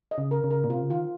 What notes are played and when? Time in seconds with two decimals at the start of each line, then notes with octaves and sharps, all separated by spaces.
0.11 D#5
0.18 C#3
0.31 A#4
0.44 C#3
0.51 A#4
0.64 A#2
0.70 C3 F4
0.81 C#3
0.90 D#3 F4